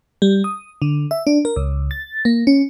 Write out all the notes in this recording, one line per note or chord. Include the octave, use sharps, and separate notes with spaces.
G3
D#6
D3
E5
D4
A#4
C#2
A6
A#3
C#4